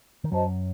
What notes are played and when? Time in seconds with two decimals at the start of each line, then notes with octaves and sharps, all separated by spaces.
0.24 D#3
0.32 F#2 F#3 F#4 C5 D#5 A5